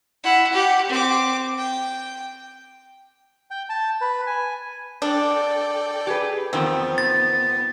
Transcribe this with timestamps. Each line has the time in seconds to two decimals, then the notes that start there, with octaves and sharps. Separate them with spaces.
0.24 E4 F#5
0.52 G4 F#5
0.89 C4 D6
1.58 G5
3.51 G5
3.70 A5
4.01 B4
4.27 G#5
5.02 D4 A4 D5 G5
6.07 G4 G#4 B4
6.53 E2 D#3 F3 B3 C4
6.98 A6